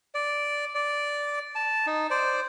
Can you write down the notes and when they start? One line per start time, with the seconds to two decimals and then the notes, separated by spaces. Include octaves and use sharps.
0.15 D5
0.75 D5
1.55 A5
1.87 D#4
2.10 C5 D5